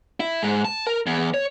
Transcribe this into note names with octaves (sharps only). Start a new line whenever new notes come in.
E4
G#2
A5
A#4
E2
C#5